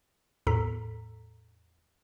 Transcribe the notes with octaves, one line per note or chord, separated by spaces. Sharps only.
E2 A2 A4 A#5 B6